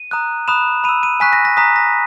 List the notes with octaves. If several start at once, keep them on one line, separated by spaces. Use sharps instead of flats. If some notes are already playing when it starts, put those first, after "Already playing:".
Already playing: D#7
A#5 D#6 F#6
B5 D#6 F#6 E7
B5 E6 D#7
D#7
G#5 C#6 F#6 B6
A#6
A#6
A#5 D#6 F#6 B6
A#6